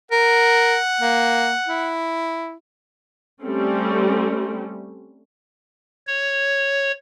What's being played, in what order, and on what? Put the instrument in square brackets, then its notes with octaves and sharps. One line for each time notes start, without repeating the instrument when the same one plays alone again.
[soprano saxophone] A#4 [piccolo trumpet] F#5
[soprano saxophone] A#3
E4
[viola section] G3 A3 C4 C#4
[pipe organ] C#5